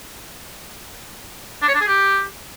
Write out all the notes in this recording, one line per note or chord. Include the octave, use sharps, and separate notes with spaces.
D4
C#5
D4
G#4
G4